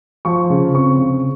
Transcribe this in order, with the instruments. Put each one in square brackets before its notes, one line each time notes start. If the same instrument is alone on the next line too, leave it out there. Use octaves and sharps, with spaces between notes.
[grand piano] F3 C#6
C#3
C4 C#6
C#3